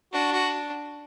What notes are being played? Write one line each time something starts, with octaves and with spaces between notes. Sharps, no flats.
D4 F#4
F#4